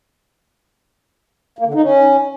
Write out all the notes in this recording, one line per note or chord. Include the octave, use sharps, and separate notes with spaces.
A#3
D3
D#4
C#4